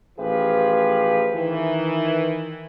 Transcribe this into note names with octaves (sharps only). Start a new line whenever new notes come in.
A1 F3 G4 G#4 B4 F5
D#3 E3